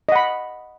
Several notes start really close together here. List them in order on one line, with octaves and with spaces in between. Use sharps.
D#5 F#5 B5